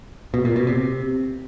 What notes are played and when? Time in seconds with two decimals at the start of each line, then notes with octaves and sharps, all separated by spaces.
0.34 B2
0.45 A#2
0.56 B2
0.67 C3